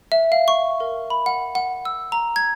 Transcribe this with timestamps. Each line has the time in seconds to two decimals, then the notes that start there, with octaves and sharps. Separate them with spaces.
0.12 E5
0.32 F5
0.48 C#6
0.80 A#4
1.10 B5
1.26 F#5
1.55 F#5
1.85 E6
2.12 A#5
2.36 G#6